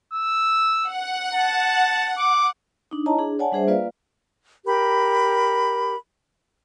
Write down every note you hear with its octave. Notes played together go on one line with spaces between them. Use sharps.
E6
F#5
A5
D6
D4 D#4
E4 C#5 D#5 A5 A#5
D4 G#4
C#5 D5 F#5 G#5 A5
G3 D4 G#4 C5 E5
A#3 F4 B4 D5 F5
G4 A#4 B5